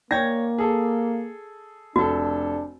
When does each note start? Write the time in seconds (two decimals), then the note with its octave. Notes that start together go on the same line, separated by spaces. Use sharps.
0.11 A#3 D4 C#5 D5 G5 G#6 A#6
0.58 G#4 A4
1.96 F1 D4 F#4 A4